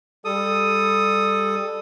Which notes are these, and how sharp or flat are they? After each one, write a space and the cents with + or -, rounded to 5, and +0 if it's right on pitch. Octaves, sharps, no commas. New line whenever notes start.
G3 +25 A4 +0 D#6 +0